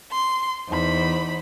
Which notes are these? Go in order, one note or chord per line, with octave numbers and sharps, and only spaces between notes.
C6
E2 D#4 C5 B5